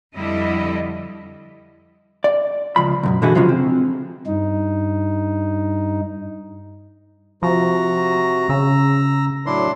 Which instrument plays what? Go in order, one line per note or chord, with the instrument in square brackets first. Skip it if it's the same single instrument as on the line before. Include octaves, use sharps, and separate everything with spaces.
[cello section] F2 D3 G3 E4 D#5
[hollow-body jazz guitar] D5
C#2 F3 B5
C2 F#2 B2
B2 D3 E3 E4 F#4 G#4
C#3 F3 F#3 G#3 C#4 F4
C4
[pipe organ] G2 D#4
[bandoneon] C3 F#4 [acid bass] F3 [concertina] A#5
[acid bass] C#3 [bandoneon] E6
[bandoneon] A2 F#3 [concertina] D4 E4 C6